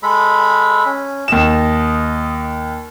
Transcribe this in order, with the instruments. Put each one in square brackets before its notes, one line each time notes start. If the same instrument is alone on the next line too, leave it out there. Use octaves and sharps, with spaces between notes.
[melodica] G#3 A4 B5
C#4
[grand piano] D#2 E7 [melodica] D#5